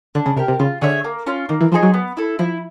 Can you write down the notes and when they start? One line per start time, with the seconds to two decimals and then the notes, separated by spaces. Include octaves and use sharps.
0.15 D3 D4
0.26 C#3
0.37 C3 G4 A#4
0.48 C3
0.59 C#3 F4
0.81 D3 G#4 C#5 E5
1.04 A#3
1.27 C#4 F4
1.49 D#3 A#3
1.61 E3
1.72 F3 D#4 G#4 C5
1.83 F#3
1.94 B3
2.17 E4 A4
2.39 F3 E4